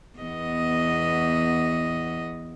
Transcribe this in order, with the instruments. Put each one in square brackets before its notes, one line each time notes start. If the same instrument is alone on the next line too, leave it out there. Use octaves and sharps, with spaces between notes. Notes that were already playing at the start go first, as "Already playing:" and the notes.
[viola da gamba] E2 B3 D#5